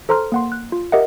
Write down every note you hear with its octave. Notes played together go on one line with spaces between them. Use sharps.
A4 C5 A#5 C6 F6
A#3 F#5 C6
F#6
F4
G4 A#4 D#5 E5 F#5